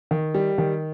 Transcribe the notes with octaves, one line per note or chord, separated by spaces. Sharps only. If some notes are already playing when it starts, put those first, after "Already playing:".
D#3
G3
D#3